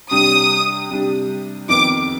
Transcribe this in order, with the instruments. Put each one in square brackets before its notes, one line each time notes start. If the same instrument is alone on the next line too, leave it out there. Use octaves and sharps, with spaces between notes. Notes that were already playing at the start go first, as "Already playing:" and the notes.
[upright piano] C3 G3 D4 G4 [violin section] D#6
[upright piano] C3 G3 D4 G4
[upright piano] F2 D#3 B3 [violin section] D6